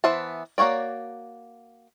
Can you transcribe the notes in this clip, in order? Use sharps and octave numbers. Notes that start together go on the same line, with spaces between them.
E3 B3 C5 E5 A5
A#3 F#4 C#5 D5